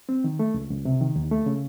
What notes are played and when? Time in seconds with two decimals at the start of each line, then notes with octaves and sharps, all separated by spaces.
0.09 C4
0.24 D#3
0.39 A3
0.54 C#2
0.70 C#2
0.85 C3
1.01 D#3
1.16 D#2
1.31 A3
1.46 C#3